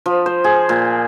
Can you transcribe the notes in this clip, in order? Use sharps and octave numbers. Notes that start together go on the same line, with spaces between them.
F3
C5
G#4
A#2